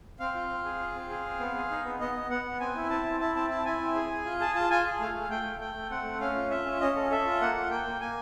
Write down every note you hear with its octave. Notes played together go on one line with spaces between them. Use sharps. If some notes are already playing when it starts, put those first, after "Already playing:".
C4 F5
F4
C4
G#4
F4
C4
G#4
C4
B3
G#4
D#4
B3
B3 D#5
B3
B3 F#5
B3
C4 G#5
E4
C4 A5
E4
E4 A5
C4 A5
E4 A5
E4 G#5
C4
G#4
G#4
F4
G#4 A5
F4 A5
F4 G#5
G#4
A3 F5
A3
A3 G5
A3
A3 G5
A3
C4 F#5
A3
C#4 F5
F4
F4 E5
C#4
C#4 D#5
A4
A4 E5
F4
A#3 F#5
F4
A#3 G5
A#3
A#3 G#5